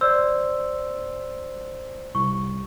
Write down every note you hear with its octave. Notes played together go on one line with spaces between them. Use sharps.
C5 D5 E6
C2 C#6